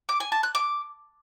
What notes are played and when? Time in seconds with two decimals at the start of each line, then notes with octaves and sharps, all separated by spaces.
0.09 D6
0.20 G#5
0.32 A5
0.43 F#6
0.55 D6